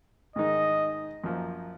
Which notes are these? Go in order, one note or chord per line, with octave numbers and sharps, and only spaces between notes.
G#2 D#3 G#3 D#4 D#5
F#2 F3 A#3